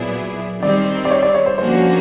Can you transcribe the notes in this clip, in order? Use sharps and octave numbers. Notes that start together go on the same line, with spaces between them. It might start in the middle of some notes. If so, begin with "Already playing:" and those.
Already playing: A#2 F#3 B3 E4 G#4 D5
D#3 G3 C4 D5
D5
C#5
D5
C#5
C5
D3 F3 A#3 C#4 F#4 C5